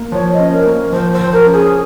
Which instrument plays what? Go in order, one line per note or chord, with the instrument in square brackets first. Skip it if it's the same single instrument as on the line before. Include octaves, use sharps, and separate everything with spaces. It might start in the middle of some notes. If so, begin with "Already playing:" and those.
Already playing: [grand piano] A#3
[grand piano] F3 [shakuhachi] C#5
[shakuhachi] D#5
[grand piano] C#4
[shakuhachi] A#4
[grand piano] A#3
[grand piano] F3 [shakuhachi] C5
[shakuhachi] C5
[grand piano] F3
[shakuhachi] A#4
[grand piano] C#4
[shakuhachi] G#4